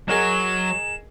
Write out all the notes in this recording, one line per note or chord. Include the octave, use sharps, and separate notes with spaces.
F#3 G#4 A#4 D#5 E7